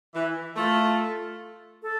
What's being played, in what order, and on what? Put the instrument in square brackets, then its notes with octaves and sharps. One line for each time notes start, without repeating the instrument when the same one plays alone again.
[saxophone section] E3 [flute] E5
[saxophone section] A3 [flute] F4
[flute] A4